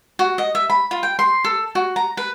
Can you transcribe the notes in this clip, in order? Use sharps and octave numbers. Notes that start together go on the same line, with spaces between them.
F#4
D#5
E5
B5
F4
G5
C6
A4
F#4
A#5
B4